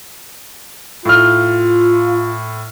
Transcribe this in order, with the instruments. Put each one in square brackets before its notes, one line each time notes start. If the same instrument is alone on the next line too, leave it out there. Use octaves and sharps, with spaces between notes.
[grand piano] A2 F6 [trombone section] F4